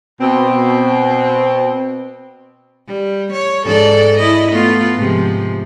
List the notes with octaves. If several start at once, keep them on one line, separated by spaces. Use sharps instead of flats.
B2 C4
G3
C#5
G#2 A4 D5
E4 D#5
A3 B3 F4
G#2 C3 F3